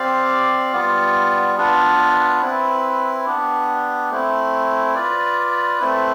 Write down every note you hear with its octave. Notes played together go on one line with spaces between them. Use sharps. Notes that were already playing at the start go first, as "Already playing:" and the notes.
Already playing: C4 G4 D5 F5
G3 B3 F4
B3 D4 F4 B4
C4 E4 B4
B3 D4 G4
A3 C4 E4
F4 B4 D5
A3 C4 E4 B4